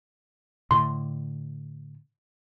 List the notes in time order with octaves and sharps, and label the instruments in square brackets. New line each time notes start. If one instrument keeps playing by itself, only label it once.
[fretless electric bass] A2 D3 [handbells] C6